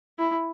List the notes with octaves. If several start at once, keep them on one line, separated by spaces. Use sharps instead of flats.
E4